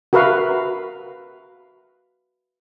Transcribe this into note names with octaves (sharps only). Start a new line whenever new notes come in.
F#4 A#4 B4 E5 F5